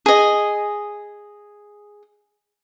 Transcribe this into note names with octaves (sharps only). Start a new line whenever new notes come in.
G#4 D#5